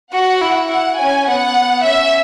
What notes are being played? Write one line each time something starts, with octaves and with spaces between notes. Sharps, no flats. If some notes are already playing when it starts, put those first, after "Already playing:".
F#4 F#5
E4
F#5
C#4 G#5
B3 F#5
C#4 E5